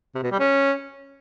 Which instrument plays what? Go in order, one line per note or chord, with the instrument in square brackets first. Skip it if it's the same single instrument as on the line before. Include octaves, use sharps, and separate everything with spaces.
[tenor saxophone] C3
B2
G3
C#4